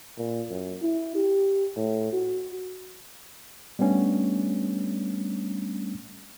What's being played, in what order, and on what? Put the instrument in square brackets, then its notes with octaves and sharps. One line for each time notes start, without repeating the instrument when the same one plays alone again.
[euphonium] A#2
F#2
E4
G4
A2
F#4
[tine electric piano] G3 A3 B3 C#4 D4